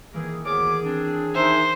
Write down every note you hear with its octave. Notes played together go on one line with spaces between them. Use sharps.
D#3 E3 A#3 G#4
D2 B3 G#4 A#4 C#5 D5 D6
C4 D4
D#3 D4 D#4 G#4 C5 E5